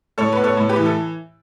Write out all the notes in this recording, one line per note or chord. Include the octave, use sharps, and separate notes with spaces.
A2 A4 C#5
B3 B4
A4 C#5
A2
G4 B4
E3
A4